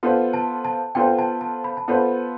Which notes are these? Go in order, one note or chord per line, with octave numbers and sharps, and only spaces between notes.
B3 F4 A4 C5
A5
A5
B3 F4 A4 C5 G5
A5
A5
B5
A5
B3 F4 A4 C5 B5